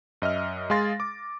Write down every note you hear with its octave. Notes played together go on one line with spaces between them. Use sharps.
F#2 D#5 E5 F6
G#3 G#4 F5 C6 A6 A#6
D6